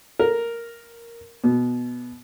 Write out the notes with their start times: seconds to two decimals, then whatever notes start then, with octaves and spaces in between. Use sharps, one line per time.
0.19 A#4
1.44 B2